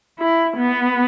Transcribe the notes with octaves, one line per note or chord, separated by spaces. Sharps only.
E4
B3